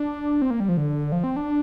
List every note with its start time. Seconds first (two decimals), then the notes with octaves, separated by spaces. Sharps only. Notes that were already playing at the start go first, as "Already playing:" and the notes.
Already playing: D4
0.42 C4
0.50 A#3
0.60 G3
0.69 F3
0.77 D3
1.12 F3
1.24 C4
1.36 D4